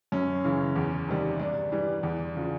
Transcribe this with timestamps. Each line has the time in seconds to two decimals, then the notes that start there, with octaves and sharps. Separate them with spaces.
0.12 F#2 C#4
0.44 C#3 E3
0.76 E2
1.08 C3 D#3 G3
1.40 G2 D4
1.72 E3 G3
2.03 E2
2.36 C#3 F3